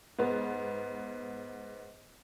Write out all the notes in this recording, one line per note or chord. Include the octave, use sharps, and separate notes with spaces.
G#2 B3